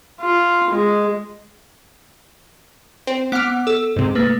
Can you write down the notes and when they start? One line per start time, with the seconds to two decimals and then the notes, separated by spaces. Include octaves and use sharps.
0.21 F4
0.70 G#3
3.07 C4
3.32 B3 F#5 D6 F6
3.67 A4 E6
3.96 G#2 C3
4.15 A3 A#3 B4